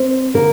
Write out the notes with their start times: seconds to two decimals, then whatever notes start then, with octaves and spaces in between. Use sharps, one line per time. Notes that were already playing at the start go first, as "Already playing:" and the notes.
Already playing: C4 C5
0.34 D3 A#3 A#4